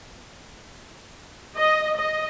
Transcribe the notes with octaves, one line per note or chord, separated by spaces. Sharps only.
D#5
D#5